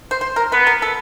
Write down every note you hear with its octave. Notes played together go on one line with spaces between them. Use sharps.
C5
C5
A#4
B3 B4
A#4
A4